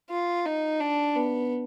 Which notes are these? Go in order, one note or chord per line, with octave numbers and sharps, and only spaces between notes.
F4
D#4
D4
B3